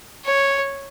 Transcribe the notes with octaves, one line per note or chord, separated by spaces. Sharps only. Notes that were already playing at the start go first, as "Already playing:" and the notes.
C#5